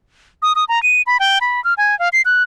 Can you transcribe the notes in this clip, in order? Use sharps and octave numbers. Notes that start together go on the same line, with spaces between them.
D#6
D#6
A#5
D#7
B5
G5
B5
F6
G#5
F5
C7
F#6